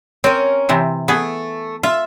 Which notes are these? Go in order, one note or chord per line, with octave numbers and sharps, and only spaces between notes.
C4 C#4 A#4
C3 E3 C4
A3 B3 G#4
F4 E5